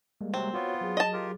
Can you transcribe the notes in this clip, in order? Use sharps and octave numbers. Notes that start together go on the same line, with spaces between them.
G3 G#3 A#3
C3 F#3 C4
B3 F4 F#4 C#5
F#3 G#4
D#5 A5
F4 G4 A#4